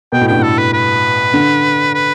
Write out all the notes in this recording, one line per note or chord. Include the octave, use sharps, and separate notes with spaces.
B2 G5
A2
G2 G5
A2 A4
B4
B4
D3
B4